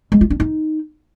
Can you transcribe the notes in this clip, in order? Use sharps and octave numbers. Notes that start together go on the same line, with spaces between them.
G#3
F4
D4
D#4